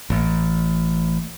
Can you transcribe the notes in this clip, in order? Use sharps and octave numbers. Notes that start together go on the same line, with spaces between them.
A1